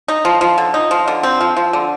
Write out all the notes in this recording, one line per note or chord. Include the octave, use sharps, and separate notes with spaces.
D#4
F3
F3
D3
D#4
F3
D3
C4
F3
F3
D3